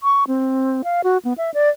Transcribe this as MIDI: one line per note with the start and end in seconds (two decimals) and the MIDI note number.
0.03 0.24 85
0.28 0.82 60
0.84 1.01 77
1.04 1.18 66
1.25 1.33 59
1.38 1.51 76
1.54 1.69 74